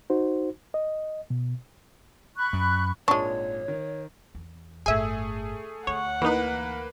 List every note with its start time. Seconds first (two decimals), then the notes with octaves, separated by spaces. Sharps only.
0.10 D#4 F#4 C5
0.74 D#5
1.30 B2
2.37 B5 C#6 F#6
2.53 F#2
3.08 G#1 A#2 G#3 D4 C#5 C#6
3.68 D#3
4.35 E2
4.86 G1 A2 A3 G#4 E5 G#5
5.87 D2 C#5 F#5
6.22 E3 A#3 D#4 B4